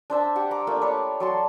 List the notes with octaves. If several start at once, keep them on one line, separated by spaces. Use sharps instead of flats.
D4 C5 E5 A5
G4 F#5
A#5 D6
A3 A#3 D4 F4
D4 C#5 B5
F#3 A5 C6